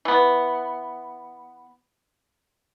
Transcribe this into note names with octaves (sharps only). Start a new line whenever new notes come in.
E3 B3